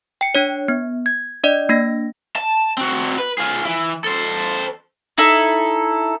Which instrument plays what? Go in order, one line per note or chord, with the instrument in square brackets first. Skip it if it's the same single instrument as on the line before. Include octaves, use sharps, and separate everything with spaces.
[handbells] G5 C#7
D4 C#5
B3
G#6
D4 D5 D#5
A#3 D4 A#6
[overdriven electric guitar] A5
C4 F#4
B4
F4 G#4
E3
A4 C5
[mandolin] D#4 E4 A4